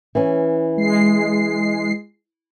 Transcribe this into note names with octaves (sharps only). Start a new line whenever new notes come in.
E3 C#4
G#3 C7